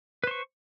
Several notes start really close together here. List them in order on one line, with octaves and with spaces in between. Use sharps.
B4 C5 C#6